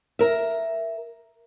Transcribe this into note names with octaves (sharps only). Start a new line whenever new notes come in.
A#4 E5